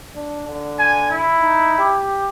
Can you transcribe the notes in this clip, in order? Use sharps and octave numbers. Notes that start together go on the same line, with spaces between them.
D4
D3
G#5
E4
D#4
G4